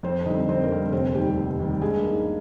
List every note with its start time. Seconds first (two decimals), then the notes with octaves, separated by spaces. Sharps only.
0.03 F2 C4 C5
0.25 D3 G3 C4 D#4 D#5
0.48 F2 C4 C5
0.63 A#3 A#4
0.70 D3 G3 C4
0.92 F1 C4 C5
1.15 D#2 D#3 G3 G4
1.36 F1
1.59 D#2 D#3 G3
1.81 G2 G#3 G#4
2.03 D#3 A#3